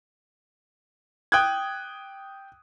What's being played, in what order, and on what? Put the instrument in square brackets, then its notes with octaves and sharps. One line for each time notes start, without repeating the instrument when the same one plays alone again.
[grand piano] G5 D#6 F#6 G#6